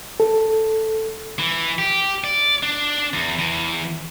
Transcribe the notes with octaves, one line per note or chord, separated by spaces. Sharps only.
A4
E3
G4
D5
D4
E2
E2 E3